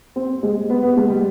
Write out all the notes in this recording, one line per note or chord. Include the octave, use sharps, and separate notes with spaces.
C4
G#3
B3
B3
G#3
G3